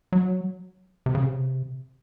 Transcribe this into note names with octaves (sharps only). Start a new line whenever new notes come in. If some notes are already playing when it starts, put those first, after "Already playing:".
F#3
C3
C#3
C3